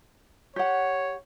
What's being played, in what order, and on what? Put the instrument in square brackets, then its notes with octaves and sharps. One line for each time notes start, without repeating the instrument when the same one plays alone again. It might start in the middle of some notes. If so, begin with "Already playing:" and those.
[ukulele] G4 F#5 [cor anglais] C#5